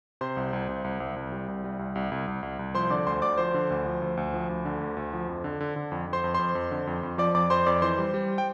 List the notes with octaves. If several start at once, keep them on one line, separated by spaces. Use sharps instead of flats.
C3 C5 C6
C2
C2
C2
C2
C2
C2
G3
C2
G3
C2
C2
C2
C2
C2
C2
F3 C5 C6
D3 D5 D6
D2 C5 C6
D2 D5 D6
F3 C5 C6
D3
D2
F3
D2
D2
F3
D2
D3
D2
D2
F3
F2
D3
D3
D3
F2
F2
C5 C6
F2
F2 C5 C6
F2
D3
F2
F2
F3 D5 D6
F2 D5 D6
F2 C5 C6
F2 D5 D6
E3 C5 C6
G3
G3
G5